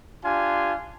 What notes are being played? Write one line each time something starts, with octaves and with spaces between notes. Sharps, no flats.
D4 F4 G4 G#5